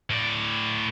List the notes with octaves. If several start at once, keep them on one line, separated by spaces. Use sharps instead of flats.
A2 D5